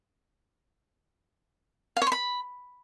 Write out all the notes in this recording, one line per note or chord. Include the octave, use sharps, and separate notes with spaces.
F5
C#5
C6
B5